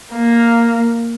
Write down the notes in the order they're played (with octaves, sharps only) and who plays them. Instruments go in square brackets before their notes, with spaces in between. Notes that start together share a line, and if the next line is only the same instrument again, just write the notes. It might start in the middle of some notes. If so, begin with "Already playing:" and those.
[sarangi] A#3